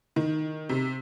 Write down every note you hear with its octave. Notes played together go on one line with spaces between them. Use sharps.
D#3
C3